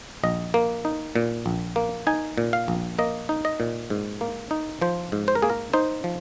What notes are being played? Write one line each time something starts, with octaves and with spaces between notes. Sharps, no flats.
A#1 D#5
A#3
D#4
A#2
A#1
A#3
D#4 G#5
A#2
F5
A#1
A#3 D#5
D#4
D#5
A#2
G#2
A#3
D#4
F3 C5
G#2
C5
A#4
A#3 G#4
A#4
D#4 C5
F3